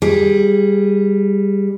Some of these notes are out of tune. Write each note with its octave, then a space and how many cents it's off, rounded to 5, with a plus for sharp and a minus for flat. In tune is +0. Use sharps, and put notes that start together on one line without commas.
G3 +10 G#4 +0